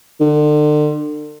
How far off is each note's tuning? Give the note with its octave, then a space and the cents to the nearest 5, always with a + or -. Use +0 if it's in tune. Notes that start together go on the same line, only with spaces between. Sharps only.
D3 +40